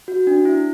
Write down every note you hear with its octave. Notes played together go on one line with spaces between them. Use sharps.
F#4
D4
E4